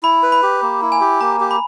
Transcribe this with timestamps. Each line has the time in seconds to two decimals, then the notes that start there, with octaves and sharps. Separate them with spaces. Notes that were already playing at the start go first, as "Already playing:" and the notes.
0.03 E4 B5
0.23 B4
0.32 B5
0.43 G4
0.62 A#3
0.82 E4
0.92 G#5
1.01 G4
1.21 A#3 A#5
1.40 G4
1.51 B5